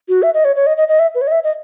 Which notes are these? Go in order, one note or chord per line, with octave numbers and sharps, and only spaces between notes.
F#4
E5
D#5
C#5
C#5
D#5
D#5
D#5
E5
B4
C#5
D#5
E5
D#5